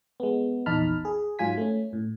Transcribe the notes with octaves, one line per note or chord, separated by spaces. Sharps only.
G#3 B3
A#1 E2 D#4 A5 B5 F6
G#4
G#2 F#3 F4 G#5 B6
A3 C#4
A2